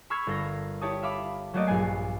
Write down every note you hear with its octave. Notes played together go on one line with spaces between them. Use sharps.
B5 C#6 E6 F6 G#6 C7
G1 A4 A#4 A#6
E4 G4 C#5 A5 D#6
E5 F5 B5 D6
F#3 A3 A#3 F#4 D5 D#5
A#1 G2 B3 G#5 C7